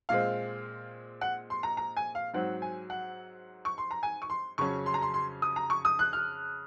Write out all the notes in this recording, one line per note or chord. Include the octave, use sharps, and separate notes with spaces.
A#2 G#3 C4 F5
F#5
C6
A#5
A#5
G#5
F5
G#2 F#3 C4 F#5
G#5
F#5
C#6
C6
A#5
G#5
C#6
C6
F2 C#3 F#3 C#4 C#6
C6
A#5
C6
C6
D#6
A#5
C#6
D#6
F#6
F6